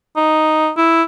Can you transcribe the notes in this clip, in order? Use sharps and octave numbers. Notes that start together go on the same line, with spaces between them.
D#4
E4